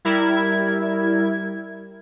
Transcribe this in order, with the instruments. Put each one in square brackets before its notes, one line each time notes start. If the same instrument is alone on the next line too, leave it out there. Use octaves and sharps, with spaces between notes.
[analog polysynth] G3 E4 A#4 G#6